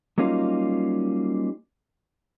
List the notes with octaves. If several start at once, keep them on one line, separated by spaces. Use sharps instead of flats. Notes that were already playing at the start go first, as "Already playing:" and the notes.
F#3 G3 A#3 C#4 D#4 F4